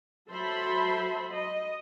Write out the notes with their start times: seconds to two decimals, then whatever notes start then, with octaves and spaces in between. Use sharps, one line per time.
0.29 F#3 A4 C5 E5 B5
1.33 D#5